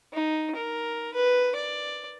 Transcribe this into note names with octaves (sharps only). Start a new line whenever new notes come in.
D#4
A#4
B4
D5